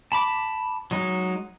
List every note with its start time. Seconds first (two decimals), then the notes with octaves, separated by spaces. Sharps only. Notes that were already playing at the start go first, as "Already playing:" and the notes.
0.12 A5 B5 D6
0.91 F#3 G#3 D#4